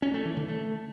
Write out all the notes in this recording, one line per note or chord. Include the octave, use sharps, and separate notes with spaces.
C#4
A3
E3
D3
A3